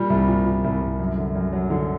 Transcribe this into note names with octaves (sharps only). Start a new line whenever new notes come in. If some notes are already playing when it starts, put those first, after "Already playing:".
Already playing: A#2 G3
C2
A#2
A#2
C2
C2
F#2
D3
F#2
F#3
D3